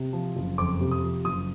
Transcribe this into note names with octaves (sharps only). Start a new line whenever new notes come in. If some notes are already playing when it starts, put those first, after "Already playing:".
Already playing: C3
F3
F#1
F2 D6
C3
D#6
F3
F#1 D#6